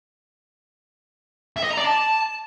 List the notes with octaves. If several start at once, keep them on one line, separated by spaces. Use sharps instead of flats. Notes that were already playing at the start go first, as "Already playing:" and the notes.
E5
D#5
A#5
D5
A5